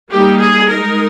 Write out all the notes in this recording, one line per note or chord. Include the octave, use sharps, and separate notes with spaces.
G3 A#3 D#4 G4
G#4
G#3 D#4 A#4